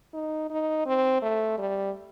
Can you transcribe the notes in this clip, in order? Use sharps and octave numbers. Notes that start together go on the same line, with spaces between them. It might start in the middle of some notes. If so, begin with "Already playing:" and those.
D#4
D#4
C4
A3
G3